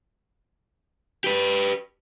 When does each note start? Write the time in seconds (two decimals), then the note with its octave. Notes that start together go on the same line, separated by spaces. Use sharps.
1.24 G4 B4